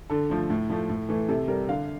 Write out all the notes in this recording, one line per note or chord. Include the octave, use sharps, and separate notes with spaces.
D3 A4
F3 A3
A2
F3 A3
A2
E3 A3
C3 A4
G3 A#4
D3 F5